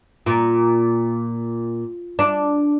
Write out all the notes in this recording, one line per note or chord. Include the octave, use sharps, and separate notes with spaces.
A#2
D4